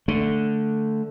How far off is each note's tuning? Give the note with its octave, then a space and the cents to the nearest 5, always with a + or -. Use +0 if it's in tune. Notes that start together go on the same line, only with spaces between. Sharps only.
D3 +0 A3 +0